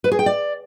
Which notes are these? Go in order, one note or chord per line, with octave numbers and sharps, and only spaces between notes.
B4
G#4
G5
D5